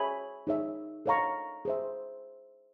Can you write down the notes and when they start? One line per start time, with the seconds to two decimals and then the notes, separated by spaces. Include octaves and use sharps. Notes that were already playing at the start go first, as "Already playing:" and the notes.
Already playing: G#4 C#5 E5 G#5 B5
0.47 D#4 G#4 C#5 E5
1.06 A4 C#5 F5 A#5 C#6
1.65 G#4 C5 E5